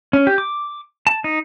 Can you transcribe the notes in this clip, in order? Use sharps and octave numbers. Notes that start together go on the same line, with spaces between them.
C#4
G4
D6
A5
D#4